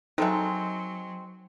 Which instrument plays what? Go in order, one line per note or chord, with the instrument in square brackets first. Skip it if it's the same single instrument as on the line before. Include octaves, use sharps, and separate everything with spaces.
[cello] F#3 [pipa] G#3 C4 [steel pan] D#4 A4 E5